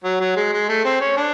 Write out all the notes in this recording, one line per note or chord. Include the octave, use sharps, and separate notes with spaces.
F#3
F#3
G#3
G#3
A3
C4
C#4
D4